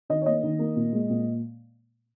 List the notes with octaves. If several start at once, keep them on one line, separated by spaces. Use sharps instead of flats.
D#3 D#5
C#5
A#3 D#5
D#3
A#3
A#2
G#3
A#2